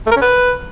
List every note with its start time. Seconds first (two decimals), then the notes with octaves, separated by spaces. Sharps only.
0.07 A3
0.12 A#4
0.17 C#4
0.22 B4